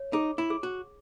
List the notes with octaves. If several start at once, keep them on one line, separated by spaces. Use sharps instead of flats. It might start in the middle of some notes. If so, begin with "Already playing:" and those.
Already playing: C#5
D#4 G#4
E4
G#4
F#4